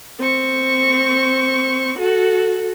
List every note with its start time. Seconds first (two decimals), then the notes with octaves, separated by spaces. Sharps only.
0.20 C4 C#6
1.98 F#4 A4